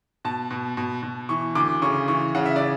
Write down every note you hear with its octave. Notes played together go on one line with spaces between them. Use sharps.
B2 A5
B2
B2
B2
E3 C#6
D2 D6
C#3 C#6
E3 C#6
C#3 F#5
E5
C#3 D5